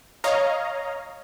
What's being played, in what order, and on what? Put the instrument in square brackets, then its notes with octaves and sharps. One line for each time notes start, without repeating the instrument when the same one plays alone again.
[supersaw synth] C#5 D#5 F5 A#5